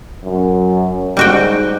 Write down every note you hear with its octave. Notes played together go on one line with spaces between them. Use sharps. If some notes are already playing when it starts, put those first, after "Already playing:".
F#2
G#2 G3 F#4 G5